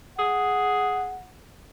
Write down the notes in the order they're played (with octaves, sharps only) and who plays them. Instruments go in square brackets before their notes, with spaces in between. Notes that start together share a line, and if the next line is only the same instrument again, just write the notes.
[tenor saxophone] G#4 [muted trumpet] F#5